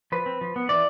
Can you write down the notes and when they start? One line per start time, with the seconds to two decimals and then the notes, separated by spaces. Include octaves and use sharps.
0.12 F3 B4
0.26 C4
0.41 F3
0.56 B3
0.69 E3 D5